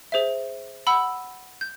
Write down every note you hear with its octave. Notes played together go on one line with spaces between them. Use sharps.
G#4 C5 E5
F#5 B5 E6
G6